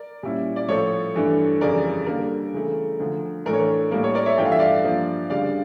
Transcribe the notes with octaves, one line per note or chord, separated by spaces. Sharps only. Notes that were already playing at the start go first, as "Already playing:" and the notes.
Already playing: A#4 D5
A#2 G3 C#4 E4
D5
A2 F3 A3 A4 C#5
G2 E3 A3 D4
F2 C#3 E3 G3 A#4 D5
D3 G3 A#3 A#4
C#3 E3 A3
D2 D3 F3
A2 E3 A3 D4 A#4
C#5
A#4
A2 G3 A#3 A#4
A4 C#5
A#4 D5
C#5 E5
G2 E3 A3 D4 F4 G5
F5
E5
D5 F5
G2 F3 A#3 D4 F4
D2 C#3 G3 D4 D5 F5